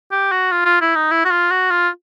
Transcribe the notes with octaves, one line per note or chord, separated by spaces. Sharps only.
G4
F#4
F4
F4
E4
D#4
E4
F#4
F4
F#4
F4